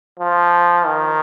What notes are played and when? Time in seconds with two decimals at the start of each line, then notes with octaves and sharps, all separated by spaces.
0.19 F3
0.86 D#3